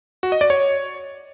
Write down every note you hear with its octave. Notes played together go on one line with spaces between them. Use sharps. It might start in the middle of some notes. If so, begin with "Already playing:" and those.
F#4
D#5
D5
C#5